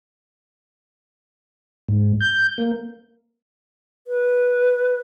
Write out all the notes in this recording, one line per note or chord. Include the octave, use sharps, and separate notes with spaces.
G#2
G6
A#3
B4